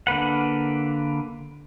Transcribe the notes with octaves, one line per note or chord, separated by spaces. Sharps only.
D3 A#3 B4 F#5